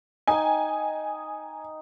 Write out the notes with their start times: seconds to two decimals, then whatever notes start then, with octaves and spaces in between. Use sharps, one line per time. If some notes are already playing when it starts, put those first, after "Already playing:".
0.27 D#4 G5 G#5